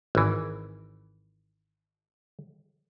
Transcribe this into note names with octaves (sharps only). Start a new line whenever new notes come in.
G#1 E3